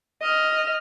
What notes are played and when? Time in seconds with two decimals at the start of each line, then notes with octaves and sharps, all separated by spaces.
0.22 D#5 F6